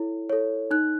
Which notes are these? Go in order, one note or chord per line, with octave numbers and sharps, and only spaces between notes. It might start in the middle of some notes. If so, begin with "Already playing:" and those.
Already playing: E4 A4 C#5
A4 C#5
D#4 F#6